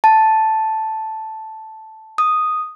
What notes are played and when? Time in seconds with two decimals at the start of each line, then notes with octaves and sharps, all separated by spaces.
0.04 A5
2.18 D#6